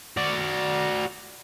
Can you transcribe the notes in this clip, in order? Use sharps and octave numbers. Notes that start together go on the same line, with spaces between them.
F#4 D5